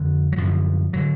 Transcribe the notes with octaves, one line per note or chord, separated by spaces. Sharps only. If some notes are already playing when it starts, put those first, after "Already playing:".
Already playing: F2 D3
F#3
F#2 D3 F3
D3 F#3